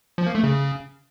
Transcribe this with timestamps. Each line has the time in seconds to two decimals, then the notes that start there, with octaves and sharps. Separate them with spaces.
0.18 F3
0.27 A#3
0.35 A3
0.43 C#3